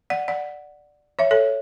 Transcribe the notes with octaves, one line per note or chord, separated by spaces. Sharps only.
D5 F#5
D5 F#5
C#5 E5
A4 C#5